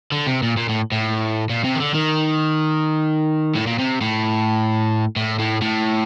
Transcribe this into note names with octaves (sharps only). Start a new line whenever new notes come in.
D3
C3
A#2
A#2
A2
A2
A#2
C3
D#3
D3
D#3
A2
A#2
C3
A2
A2
A2
A2